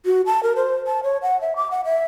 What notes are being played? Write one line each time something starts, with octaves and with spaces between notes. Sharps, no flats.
F#4
A5
A#4
C5
A5
C#5
F#5
E5
D6
F#5
E5